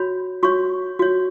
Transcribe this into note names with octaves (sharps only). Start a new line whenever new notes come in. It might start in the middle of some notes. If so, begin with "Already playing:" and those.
Already playing: F#4 C#5 B5
F#4 C#5 C#6
F#4 C#5